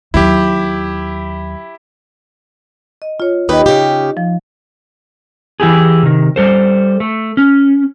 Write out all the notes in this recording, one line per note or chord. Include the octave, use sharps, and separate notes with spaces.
D#2 F#3 E4 G4
D#5
F4 C#5
D#2 D#4 G4 B4 D#5
C#3 G4
F3
E3 E4 G4 G#4
C3 D#3
G3 A4 C5
A3
C#4